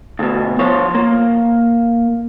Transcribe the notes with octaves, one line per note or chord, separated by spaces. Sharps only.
D2 B2
F3 C5 C#5
A#3